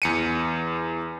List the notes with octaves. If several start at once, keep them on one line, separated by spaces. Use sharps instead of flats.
E2 C#7 D#7